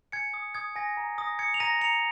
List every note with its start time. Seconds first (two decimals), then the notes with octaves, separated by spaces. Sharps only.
0.12 G#5 G#6 C#7
0.34 D#6
0.55 D#6 G#6
0.76 G#5 A#6
0.97 A#5
1.18 D#6 A#6
1.39 D#6 G#6 C#7
1.54 F7
1.60 A#5 A#6 D#7
1.81 A#5 C#7 F7